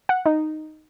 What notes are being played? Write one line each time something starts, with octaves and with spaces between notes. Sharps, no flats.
F#5
D#4